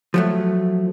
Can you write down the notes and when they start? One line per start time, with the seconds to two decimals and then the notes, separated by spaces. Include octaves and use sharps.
0.14 F3 F#3 A3